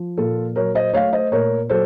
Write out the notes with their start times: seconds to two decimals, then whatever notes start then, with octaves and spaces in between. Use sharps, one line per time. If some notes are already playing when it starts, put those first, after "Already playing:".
Already playing: F3
0.17 A#2 F4 A4
0.56 F#3 A#4 C#5
0.75 C5 D#5
0.93 A3 C#5 F5
1.13 C5 D#5
1.32 A#2 A#4 C#5
1.70 F#3 A4 C5